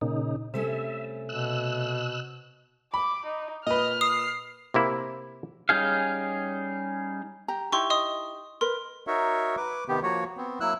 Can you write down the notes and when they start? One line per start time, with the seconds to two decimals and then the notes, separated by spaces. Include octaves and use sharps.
0.01 A#2 C#3 D#4
0.54 C3 G3 A3 C#4 E5
1.29 B2 E6 F#6
2.94 B5 D6
3.26 D#4
3.67 A#2 B4 D#5 F6
4.01 D#6 C7
4.74 C3 A#3 E4
5.69 G3 C#4 D#4 G#4 F5
7.48 G4 A#5
7.72 D#4 E4 G4 C6 C#6
7.90 D#5 C6 D#6
8.61 A#4 B4 C6
9.07 D#4 F#4 A#4 C#5 E5
9.57 B4 D6
9.89 C3 D#3 B3 G4
10.03 F3 A#3 F#4 C#5
10.37 B3 C4
10.60 F#3 A#3 E4 E6 F#6